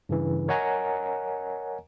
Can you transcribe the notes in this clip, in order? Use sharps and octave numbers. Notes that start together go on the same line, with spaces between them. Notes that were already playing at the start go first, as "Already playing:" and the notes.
G2 C#3 E3
A#4 C#5 D#5 F#5 G#5 A#5